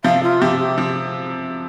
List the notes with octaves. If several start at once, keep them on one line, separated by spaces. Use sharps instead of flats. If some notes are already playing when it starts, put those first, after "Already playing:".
C3 F3 F5
F4
C3 F3 G4
G4
C3 F3